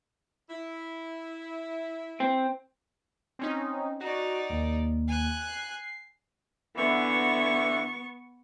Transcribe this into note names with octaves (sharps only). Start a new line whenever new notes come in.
E4
C4
C4 C#4 D#4
D#4 F#4 D5
D#2
G#5 F#6
C7
D3 E3 B3 C#6